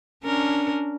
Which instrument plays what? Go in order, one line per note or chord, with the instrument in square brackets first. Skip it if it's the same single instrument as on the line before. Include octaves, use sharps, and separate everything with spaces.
[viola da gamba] C#4 D4 A#4